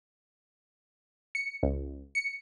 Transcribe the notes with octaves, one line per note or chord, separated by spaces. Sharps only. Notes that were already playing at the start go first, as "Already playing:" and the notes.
C#7
C#2
C#7